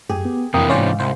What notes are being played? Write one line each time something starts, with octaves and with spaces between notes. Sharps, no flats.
F#2 G4 G#4
B3
F2 C3 E3 A#3 G5 D#6
D2 G#2 C#4 C5 D5 F5
C2 C5